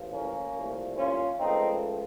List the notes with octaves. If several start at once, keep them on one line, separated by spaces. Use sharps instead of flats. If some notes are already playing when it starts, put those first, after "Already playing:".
Already playing: A1 A2 F3
A#3 C#4
C2 A#2 F3 A3
C#4 F4
C#2 C#3 F3 A3 C4 D#4